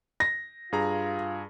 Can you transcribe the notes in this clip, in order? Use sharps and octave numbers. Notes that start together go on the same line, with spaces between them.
A#6
G2 F4 G#4 A#5